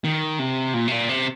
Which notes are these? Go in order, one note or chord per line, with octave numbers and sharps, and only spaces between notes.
D#3
C3
A#2
C3
A#2
C3